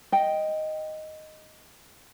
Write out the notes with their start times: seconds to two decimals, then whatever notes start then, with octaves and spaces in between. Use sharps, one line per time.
0.12 D#5 G5